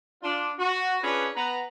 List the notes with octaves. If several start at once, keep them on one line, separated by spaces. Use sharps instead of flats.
D4 F4
F#4
C#4 D4 F4 G#4 B4
B3 B4 A#5